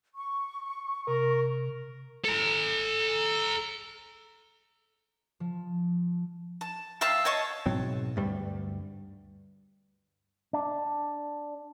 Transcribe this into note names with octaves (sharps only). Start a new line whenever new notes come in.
C#6
C3 A#4
A4 A#5
F3
A5
E5 F5 G5 A5
C#5 D#5 A5 C#6
G#2 B2 F#3 C4
D2 G2 G3
D4